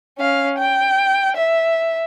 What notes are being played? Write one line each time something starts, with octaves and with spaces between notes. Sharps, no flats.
C#4 F5
G5
E5